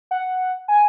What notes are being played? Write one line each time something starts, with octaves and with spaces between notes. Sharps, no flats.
F#5
G#5